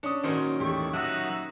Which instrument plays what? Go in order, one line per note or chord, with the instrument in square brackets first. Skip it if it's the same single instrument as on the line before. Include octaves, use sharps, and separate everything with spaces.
[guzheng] C#4 [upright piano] D4 D#6
[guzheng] A#2 D#3 [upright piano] F#3 C#4 C5
[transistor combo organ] E2 A2 [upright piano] G4 [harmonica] C#6
[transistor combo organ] F#3 E5 F#5 [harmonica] D#4 F#4